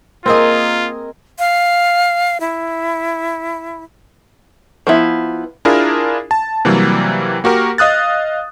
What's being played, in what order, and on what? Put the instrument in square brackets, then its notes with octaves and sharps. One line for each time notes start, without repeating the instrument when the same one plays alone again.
[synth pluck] A#3 A#4 D#5 [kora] C4 G#4 [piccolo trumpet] F4
[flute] F5
E4
[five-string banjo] F3 B3 E4
[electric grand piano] D4 E4 F4 G#4 A#4
A5
C3 E3 F#3 G3 A#3
A#3 F#4 G4 A#4
D#5 F5 D#6 F#6 A6